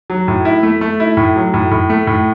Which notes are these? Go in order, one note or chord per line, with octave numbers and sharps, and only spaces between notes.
F#3
A2
E4
A3
A3
E4
A2
F#3
A2
A2
A3
A2